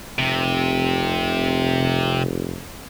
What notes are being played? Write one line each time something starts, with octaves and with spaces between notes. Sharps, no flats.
F1 C3